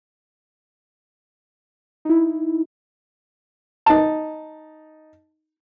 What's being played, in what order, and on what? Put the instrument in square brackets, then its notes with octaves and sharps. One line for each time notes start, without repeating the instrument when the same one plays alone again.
[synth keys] D#4 E4
[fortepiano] D#4 A5